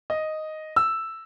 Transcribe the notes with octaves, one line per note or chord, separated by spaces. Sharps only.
D#5
E6